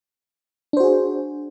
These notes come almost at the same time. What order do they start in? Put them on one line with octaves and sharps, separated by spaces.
D4 C5 F#4 G#4